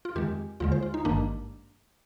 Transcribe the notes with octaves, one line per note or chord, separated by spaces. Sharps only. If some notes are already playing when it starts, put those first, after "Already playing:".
F4
F2 D#3 G#3 G4
D#2 D3 G#3 F4
C5
F4
D#4
G#1 G2 D#3 A#3 D4